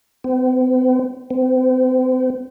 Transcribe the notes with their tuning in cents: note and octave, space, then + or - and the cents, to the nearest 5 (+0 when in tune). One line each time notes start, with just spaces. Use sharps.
C4 -45
C4 -35